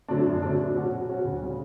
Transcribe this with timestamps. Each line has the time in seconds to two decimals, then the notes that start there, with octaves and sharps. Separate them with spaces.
0.08 D3 F#3 A3 D4
0.26 F#2
0.42 D3 F#3 A3 D4
0.59 B2
0.75 F#3 C#4 F#4
0.91 B2
1.09 F#3 C#4 F#4
1.24 D2
1.42 C#3 G3